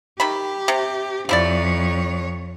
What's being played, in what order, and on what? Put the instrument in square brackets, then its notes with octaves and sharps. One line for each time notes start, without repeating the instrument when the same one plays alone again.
[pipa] D#3 A3 B5 [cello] G4
[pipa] C3
[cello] F2 C#5 [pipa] F3 E4 D5